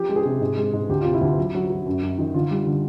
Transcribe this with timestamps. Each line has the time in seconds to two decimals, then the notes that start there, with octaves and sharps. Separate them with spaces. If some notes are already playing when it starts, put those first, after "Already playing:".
Already playing: F3 G4
0.09 G#3
0.16 G#4
0.25 C3
0.41 G#2
0.58 G#3
0.73 G#2
0.89 D2 G4
1.01 C3 F4
1.14 E4
1.21 D2
1.37 F#3
1.55 F#3
1.70 F#3
1.86 F#2
2.02 F#2
2.18 D#3
2.34 D3 F4
2.51 G3
2.66 D3